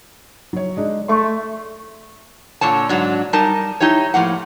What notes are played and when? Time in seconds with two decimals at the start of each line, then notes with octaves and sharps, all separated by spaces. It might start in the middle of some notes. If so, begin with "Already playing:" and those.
0.53 F#3 C#5
0.77 G#3 D4 D#4
1.08 A3 C6 C#6
2.61 A#2 D3 C#5 A5
2.89 G#2 F#3 D4
3.33 G3 D#4 A#4 A5
3.80 D#4 E4 G4 C#5
4.14 A2 F3 A#3 F#5